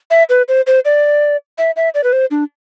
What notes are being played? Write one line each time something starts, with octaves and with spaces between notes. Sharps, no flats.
E5
B4
C5
C5
D5
E5
E5
D5
B4
C5
D4